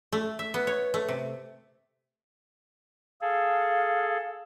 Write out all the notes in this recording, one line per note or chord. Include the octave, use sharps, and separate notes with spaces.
A3
E5
B3
C#5
A3
C3
G#4 A4 F5